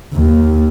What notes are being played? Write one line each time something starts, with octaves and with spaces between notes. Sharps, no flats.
D#2